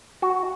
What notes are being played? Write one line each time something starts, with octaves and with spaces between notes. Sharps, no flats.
F#4